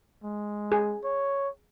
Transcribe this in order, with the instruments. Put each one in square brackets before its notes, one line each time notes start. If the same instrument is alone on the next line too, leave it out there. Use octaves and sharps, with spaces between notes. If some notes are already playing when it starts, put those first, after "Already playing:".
[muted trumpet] G#3
[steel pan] G#4
[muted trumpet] C#5